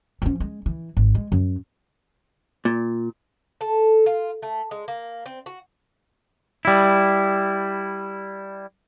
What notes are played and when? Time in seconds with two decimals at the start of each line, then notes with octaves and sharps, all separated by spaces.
0.22 F3 C#4
0.40 G#3
0.66 E3
0.97 G#1
1.15 G#3
1.32 F#2
2.65 A#2
3.61 A4
4.06 F4
4.42 A3
4.71 G#3
4.88 A#3
5.26 C4
5.46 F#4
6.65 G3 E4